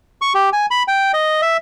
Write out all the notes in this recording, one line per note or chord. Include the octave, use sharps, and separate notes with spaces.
C#6
G4
G#5
B5
G5
D#5
E5